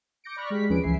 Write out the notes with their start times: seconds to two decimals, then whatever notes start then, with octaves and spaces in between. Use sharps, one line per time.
0.24 D6 G6 A#6 C#7 D7
0.36 D5 B5 C#6 F6 F#6 A#6
0.50 G#3 G4 G#4 B6
0.69 D#2 F3 C#4 G#4 B4 D7
0.83 G#1 C#2 E3 E5 G#5 C7